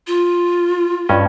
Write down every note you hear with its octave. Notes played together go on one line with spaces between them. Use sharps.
F4
G2 C#4 D#5